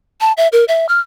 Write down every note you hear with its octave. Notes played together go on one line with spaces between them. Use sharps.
A5
E5
A#4
E5
F6